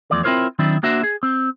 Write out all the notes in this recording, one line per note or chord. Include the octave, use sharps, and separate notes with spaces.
E2 F3 A3 D5
C4 E4 F4 A#4 C5 C#5
D#3 F#3 C4 D4 E4
A#3 D4 F#4 C5 E5
G#4
C4